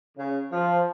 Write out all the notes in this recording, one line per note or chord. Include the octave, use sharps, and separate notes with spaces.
C#3
F3